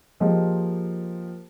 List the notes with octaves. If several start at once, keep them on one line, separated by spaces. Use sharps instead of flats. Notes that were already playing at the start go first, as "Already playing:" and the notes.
F3 A#3 F4 G4 G#4 D#5